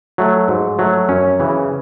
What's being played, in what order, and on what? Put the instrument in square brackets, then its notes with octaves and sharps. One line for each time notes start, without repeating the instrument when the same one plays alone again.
[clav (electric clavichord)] F#3 A3
G#2
F#3 A3
F#2 C#4
C#3 E3